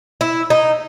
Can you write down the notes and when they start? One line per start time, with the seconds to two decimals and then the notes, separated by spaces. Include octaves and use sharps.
0.21 E4
0.50 D#4